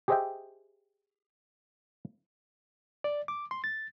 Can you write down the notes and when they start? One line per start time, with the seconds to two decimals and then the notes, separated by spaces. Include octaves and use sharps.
0.08 G4 G#4 C5 D#5 E5 G5
3.04 D5
3.28 D6
3.51 C6
3.64 A6